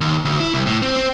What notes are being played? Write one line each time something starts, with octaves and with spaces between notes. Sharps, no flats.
D#2
D2
E4
C2
A2
C4
C4